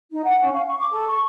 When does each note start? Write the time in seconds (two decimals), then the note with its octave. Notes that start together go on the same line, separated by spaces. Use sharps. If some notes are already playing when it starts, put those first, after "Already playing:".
0.12 D#4
0.24 F#5
0.42 C#4
0.53 F5
0.66 C#6
0.78 D6
0.92 A4
1.08 C#6